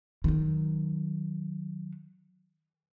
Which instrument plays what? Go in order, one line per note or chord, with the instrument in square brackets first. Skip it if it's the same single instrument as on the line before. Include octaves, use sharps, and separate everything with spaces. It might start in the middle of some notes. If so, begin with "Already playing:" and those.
[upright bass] D#3 F#3